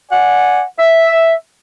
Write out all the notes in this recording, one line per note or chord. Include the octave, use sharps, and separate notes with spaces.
D5 F#5 G#5
E5